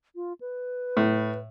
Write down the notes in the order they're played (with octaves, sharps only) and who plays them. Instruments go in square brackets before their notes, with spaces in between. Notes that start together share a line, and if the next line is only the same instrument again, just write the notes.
[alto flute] F4
B4
[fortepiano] A2